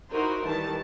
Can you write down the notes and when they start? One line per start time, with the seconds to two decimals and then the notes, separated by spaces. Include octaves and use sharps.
0.11 D#4 E4 F#4 A#4 C5
0.46 D#3 E3 G3 A5